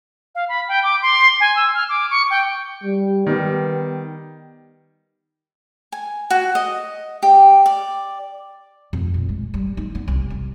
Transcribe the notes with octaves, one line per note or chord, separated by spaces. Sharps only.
F5
B5
G5
D6
C6
G#5
E6
F6
D6
C#6
G5
G3
D#3 G3 B3
G#5
F#4
D#5
G4
D5
F2
A#2
G#3
G3
D#4
B3
C2
C2